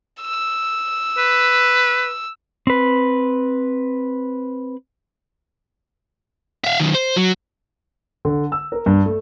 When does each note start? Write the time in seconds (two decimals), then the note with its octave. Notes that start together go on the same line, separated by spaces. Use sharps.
0.21 E6
1.18 B4
2.67 C4 B4
6.65 E5 F5
6.80 F#2 D#3
6.95 C5
7.17 F#3
8.25 D3
8.52 E6
8.72 A#4
8.86 G2
9.06 A3